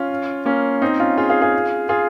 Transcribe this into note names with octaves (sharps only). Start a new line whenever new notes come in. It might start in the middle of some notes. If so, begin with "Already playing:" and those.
Already playing: C#4 F4
A#3 C#4
C4 D#4
C#4 F4
F4 G#4
F4 G#4
F4 G#4
F4 G#4